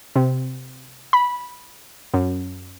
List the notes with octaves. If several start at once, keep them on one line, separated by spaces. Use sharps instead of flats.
C3
B5
F#2